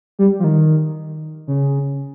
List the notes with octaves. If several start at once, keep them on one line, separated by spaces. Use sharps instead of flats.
G3
F3
D#3
C#3